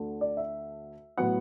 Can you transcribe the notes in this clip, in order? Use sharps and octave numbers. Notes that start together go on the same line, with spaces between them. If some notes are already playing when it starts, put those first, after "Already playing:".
Already playing: D2 D3 A3
D5
E5
A2 F#3 B3 F#5